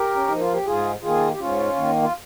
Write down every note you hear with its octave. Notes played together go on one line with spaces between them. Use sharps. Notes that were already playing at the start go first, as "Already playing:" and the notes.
Already playing: G4 A#4
C#4
F3 A#3 D#4
F4
G4
G#2 F4 G#4
D#3 A#3 F4 G#4
G4
G#2 C#4 F4
D#3 A#3
F4